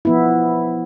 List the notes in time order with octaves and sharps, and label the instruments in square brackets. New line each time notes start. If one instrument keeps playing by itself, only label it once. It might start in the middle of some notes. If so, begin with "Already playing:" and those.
[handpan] F3 B3 E4